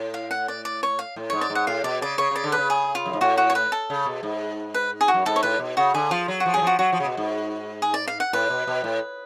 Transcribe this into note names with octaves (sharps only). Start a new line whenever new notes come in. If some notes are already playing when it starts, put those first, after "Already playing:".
Already playing: A2
F5
F#5
D5
D5
C#5
F5
A2
G#2 C#5
D5
G#2
F#5
A2 F5
B2 D5
C#3 D5
C#3 C#5
C#3 D5
D3
B4
C#3
G#4
F4
F#2
G#2
A2 F#4
F#4
C#5
B4
A4
C#3
B2
G#2
B4
G#4
F#4
F#2
G#2 A4
C#5
A2 B4
B2
C#3 F#4
D3 G#4
F3 F4
F#3
F#4
F3
F#3 G#4
F3
F#4
F#3 F#4
F3
C#3
B2
G#2
G#4
D5
F5
F#5
A2 B4
B2
B2
A2